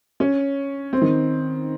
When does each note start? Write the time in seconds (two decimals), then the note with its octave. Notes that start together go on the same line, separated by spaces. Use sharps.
0.20 C#4
0.93 C4
1.02 D#3